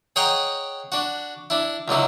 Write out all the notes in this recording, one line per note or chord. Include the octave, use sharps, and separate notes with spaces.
G#4 C#5 D#5 F#5 G5 A#5
D4 F#4
D4 E4
C#2 D3 F#3 E4